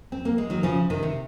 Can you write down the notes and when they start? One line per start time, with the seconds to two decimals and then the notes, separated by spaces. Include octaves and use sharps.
0.12 C4
0.25 A#3
0.38 G#3
0.50 D#3 F#3
0.63 C#3 F3
0.90 C3 D#3
1.03 C3